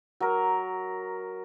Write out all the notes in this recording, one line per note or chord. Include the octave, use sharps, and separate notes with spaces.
F#3 A#4